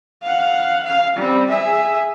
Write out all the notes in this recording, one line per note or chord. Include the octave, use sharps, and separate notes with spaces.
F5 F#5
F5
G3 C4
G#4 E5